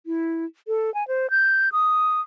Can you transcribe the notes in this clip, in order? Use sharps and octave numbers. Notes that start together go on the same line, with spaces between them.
E4
A4
G#5
C5
G6
D#6